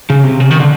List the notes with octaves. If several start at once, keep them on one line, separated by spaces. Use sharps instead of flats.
C#3
C3
C#3
D#3
D3